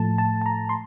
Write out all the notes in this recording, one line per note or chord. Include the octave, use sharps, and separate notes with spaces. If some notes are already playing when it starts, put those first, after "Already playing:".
Already playing: A2 F3 A3 A5
A5
A5
A#5
C6